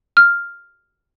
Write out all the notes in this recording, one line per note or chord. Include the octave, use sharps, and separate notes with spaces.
F6